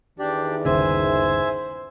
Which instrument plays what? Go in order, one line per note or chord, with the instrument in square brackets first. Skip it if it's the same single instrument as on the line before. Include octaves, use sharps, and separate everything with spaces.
[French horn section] E2 D#3 [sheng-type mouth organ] D4 G4 D5
[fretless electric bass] G1 D#2 C#3 [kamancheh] C5 [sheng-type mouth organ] E5 G#5